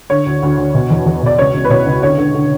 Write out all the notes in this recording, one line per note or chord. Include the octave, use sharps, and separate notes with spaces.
D3 C#5
D2
D2
D2
B2
E2
E2
B2 D5
C#2 C#5
C#2
B4
B2 C#5
C#2
D3 C#5
D3
D3